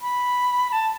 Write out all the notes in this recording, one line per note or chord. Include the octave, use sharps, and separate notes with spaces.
B5
A5